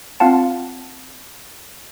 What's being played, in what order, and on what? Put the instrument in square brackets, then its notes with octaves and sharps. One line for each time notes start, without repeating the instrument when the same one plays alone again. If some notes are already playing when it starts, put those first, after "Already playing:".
[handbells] C4 F4 F5 F#5 A5